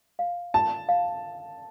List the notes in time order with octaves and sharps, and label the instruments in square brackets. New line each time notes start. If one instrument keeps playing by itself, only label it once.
[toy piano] F5
[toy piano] F4 [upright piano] A5
[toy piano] F5